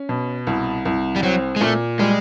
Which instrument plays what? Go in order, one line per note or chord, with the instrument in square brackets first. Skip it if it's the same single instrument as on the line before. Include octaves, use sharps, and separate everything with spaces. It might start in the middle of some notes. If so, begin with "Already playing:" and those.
Already playing: [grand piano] C#4
B2
C2
C2
[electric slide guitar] G3
[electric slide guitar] F#3 [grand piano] C4
[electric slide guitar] G#3
[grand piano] A#2 [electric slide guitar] A3
[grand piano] G3 [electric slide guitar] G#3